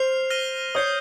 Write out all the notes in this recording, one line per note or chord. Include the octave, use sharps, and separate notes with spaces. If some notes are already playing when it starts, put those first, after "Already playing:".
Already playing: C5 F6 C7 F7
F6 A#6 D#7 G7
C#5 D#6 G6 C7